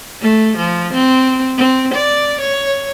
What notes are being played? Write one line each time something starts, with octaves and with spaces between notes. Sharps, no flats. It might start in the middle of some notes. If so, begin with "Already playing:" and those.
A3
F3
C4
C4
D5
C#5